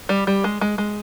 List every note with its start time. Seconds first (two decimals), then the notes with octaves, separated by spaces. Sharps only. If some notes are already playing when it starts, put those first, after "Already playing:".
0.09 G3
0.27 G3
0.44 G#3
0.61 G#3
0.78 G#3